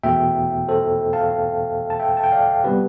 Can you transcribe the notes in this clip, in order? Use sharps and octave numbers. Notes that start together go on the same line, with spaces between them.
E2 B2 A3 E5 G5
A4 C5
F5 A5
A5
E5 G5
A5
G5
D5 F5
C3 G3 B3 G4 B4